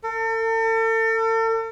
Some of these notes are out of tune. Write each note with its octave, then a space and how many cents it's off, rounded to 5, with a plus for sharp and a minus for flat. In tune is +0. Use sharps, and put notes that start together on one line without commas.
A4 +40